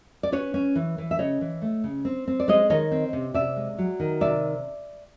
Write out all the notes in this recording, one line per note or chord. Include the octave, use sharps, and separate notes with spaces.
D5
C#4 B4 C#5
C#4
E3
E3
E5
C#3 C#5 D#5
E3
A3
C#3
C4
C4
D5
G#3 C#5 D#5
D#3 C#5 D#5
C4
C3
C3 D5 E5
G#3
F#3
D#3
C3 D5 E5